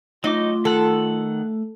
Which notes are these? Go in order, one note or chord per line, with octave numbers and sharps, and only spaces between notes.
F#3 A3 D#4 F4 D#5 D6
D#3 A4 F#5